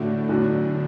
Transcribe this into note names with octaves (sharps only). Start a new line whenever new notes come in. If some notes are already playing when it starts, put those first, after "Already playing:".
Already playing: A2 D3 A3 D4 F#4
B1 A2 F#3 D4 F#4